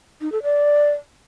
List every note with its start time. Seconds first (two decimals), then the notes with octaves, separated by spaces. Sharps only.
0.21 D#4
0.32 A4
0.43 D5